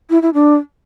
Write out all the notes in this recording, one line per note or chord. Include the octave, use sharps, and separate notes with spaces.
E4
E4
D4